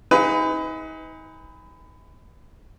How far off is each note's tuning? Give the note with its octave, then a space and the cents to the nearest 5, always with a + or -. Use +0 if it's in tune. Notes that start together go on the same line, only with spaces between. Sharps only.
D#4 +35 G#4 -25 B4 +25